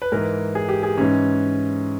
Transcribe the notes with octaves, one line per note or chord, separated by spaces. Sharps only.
B4
G#2 E3 A#4
G#4
G4
G#4
G#2 E3 C#4